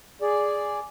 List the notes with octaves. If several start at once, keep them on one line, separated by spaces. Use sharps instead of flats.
G#4 D5